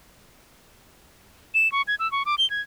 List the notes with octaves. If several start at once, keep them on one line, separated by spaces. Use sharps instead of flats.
E7
C#6
G#6
E6
C#6
D6
G7
G#6